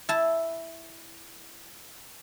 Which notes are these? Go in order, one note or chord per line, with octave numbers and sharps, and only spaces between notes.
E4 A5